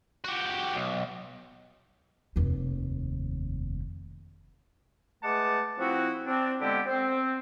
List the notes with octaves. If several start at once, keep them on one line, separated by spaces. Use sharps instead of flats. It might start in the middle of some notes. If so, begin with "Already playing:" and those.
F#4 G4
B1
F1 D#2
G#3 A3 B4 F#5 A5 D6
F3 C4 E4 F#4
C4 D4
D3 G#3 B3 E4 G4
C4